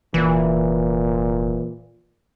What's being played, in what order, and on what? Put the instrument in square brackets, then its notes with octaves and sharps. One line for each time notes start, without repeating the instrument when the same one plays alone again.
[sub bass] F1 [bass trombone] A#2 [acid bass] E3